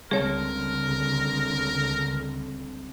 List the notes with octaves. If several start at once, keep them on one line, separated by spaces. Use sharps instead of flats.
C#2 D3 G3 C4 G#4 A#4 C#5 A5